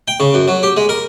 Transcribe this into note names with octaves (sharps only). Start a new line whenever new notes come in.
G5
C#3
F#2
F#3
G4
G#3
A#4